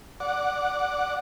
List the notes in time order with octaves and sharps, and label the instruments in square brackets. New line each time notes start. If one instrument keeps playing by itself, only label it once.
[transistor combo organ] D5 F#5